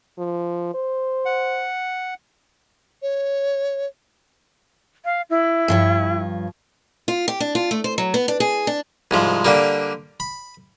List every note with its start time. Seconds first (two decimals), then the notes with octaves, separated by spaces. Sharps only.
0.18 F3
0.74 C5
1.25 F#5
3.02 C#5
5.05 F5
5.30 E4
5.68 G2 F3 C#5
7.08 F4
7.28 G4
7.40 D4
7.55 F4
7.71 A3
7.84 C5
7.98 F#3
8.14 B3
8.28 D4
8.40 G#4
8.67 D4
9.11 C2 G#2 F3
9.45 D3 G3 A#3
10.20 B5